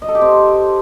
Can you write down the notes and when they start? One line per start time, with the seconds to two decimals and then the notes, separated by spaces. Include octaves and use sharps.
0.02 D#5
0.08 A4
0.15 G4
0.22 C4